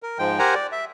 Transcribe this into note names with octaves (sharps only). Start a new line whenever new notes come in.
A#4
G#2 F3 G#3 G5
G4 A#4 C5 F#5 G#5 A#5
D5
E5